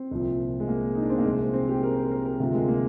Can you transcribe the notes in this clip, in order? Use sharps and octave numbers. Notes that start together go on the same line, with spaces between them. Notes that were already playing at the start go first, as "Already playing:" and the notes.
Already playing: C4
C2 A#2 F3
G#3
A#3
D#4
D4
C4
A#3
C2 A#2 F3 G#3
C4
G4
A#4
C5
A#4
A#4
D2 C3 F3 F4
G#3
A#3